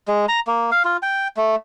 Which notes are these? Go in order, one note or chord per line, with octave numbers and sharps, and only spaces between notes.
G#3
A#5
A#3
F5
F4
G5
A3